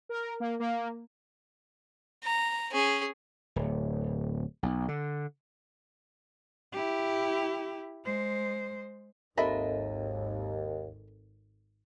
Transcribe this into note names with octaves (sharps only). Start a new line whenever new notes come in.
A#4
A#3
A#3
A#5
C#4 G#4
D1
B1
D3
E4 G4
G#3 C5
G#1 D#2 C4 A4 A#4 D#5 E5 B5